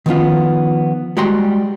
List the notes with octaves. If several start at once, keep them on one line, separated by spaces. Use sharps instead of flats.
D#3 F3 A#3 B3 C#4 F4
G3 G#3 F#4 G5 A#5 C6